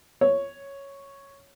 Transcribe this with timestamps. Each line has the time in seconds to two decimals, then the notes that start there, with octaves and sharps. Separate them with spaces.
0.21 C#5